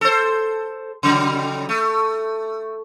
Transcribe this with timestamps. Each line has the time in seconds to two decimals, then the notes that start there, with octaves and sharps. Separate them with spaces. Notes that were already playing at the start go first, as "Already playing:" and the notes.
0.01 A4 C5
1.03 C#3 F#3 G3
1.69 A3